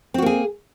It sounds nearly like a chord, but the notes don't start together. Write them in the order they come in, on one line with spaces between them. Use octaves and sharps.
C4 F#4 A#3 G#4